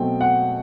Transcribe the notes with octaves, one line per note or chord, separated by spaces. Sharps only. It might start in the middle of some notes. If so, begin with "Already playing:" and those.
Already playing: B2 F#3 A3 C4 G5
F#5